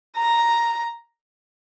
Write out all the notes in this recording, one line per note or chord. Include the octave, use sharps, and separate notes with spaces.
A#5